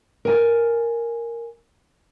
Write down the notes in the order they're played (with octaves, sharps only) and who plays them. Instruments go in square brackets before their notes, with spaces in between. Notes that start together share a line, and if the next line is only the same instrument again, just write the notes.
[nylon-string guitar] A#4 G#5